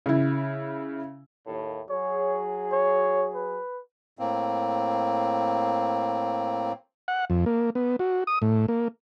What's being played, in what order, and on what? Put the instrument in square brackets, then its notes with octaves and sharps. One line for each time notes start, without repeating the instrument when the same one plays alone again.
[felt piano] C#3 E4
[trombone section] D#2 A2
[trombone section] F#3 G#4 [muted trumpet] C#5
[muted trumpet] C#5
B4
[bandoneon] A2 A#3 C4
[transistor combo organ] F#5
F2
A#3
B3
F#4
D#6
A2
A#3